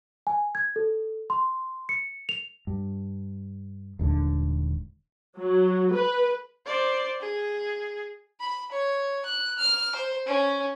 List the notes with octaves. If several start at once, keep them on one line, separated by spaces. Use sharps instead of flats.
G#5
G#6
A4
C6
C#7
F7
G2
D#1 D#2 G#2 D3
F#3
B4
C5 D5
G#4
B5
C#5
F#6
F6
C5
C#4